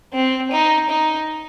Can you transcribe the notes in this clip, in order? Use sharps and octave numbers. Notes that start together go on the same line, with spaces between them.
C4
D#4
D#4